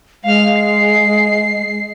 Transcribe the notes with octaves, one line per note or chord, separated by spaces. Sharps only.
G#3 F5 F6
C7